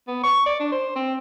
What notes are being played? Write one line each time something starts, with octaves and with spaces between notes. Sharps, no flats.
B3
C#6
D5
D4
C5
C4